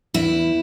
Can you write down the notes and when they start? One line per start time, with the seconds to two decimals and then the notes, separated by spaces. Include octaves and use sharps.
0.14 E2 E4